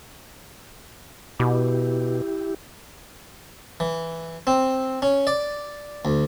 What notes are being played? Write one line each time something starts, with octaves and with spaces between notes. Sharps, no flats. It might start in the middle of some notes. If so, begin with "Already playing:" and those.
B2 E4 G4
E3
C4
C#4
D5
D2